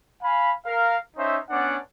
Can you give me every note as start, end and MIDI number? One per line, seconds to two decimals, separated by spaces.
0.22 0.51 77
0.22 0.51 80
0.22 0.51 83
0.66 0.98 70
0.66 0.98 77
1.17 1.38 61
1.17 1.38 63
1.17 1.38 72
1.17 1.38 76
1.50 1.77 59
1.50 1.77 61
1.50 1.77 62
1.50 1.77 74
1.50 1.77 78